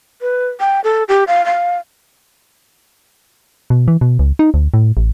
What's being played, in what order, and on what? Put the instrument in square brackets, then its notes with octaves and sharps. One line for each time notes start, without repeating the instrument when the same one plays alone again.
[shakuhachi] B4
G5
A4
G4
F5
F5
[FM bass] B2
E3
B2
C#2
D#4
D2
A2
A1